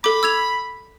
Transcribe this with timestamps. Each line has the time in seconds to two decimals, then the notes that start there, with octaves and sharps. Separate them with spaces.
0.04 A4 B5 D6
0.23 E6 G#6 F7